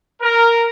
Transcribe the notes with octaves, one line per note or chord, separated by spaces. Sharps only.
A#4